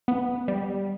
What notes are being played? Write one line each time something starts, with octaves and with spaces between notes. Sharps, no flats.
B3
G3